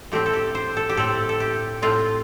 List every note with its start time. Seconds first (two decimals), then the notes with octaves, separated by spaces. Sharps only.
0.12 A2 A3 C4 G4
0.26 A4
0.33 G4
0.55 C5
0.77 A4
0.89 G4
0.97 A2 A3 C4 A4
1.29 A4
1.40 G4
1.82 A2 A3 C4 F4